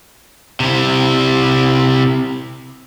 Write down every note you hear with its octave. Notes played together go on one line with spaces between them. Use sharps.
C3 E4